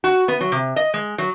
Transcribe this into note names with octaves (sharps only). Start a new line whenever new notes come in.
F#4
B3
F#3
C3
D#5
G#3
F#3